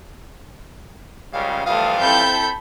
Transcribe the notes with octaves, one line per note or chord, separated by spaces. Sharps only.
C#2 C#3 G3 F5
E3 F3 G3 A3 F5 D#6
C4 E4 A4 B5 G6